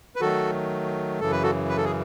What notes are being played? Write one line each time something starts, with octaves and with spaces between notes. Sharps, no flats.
B4
D#3 F#3 A3 F#4 A4
F#2 C#3 E3 A4
B4
F#4 A4
B4
A4
G#4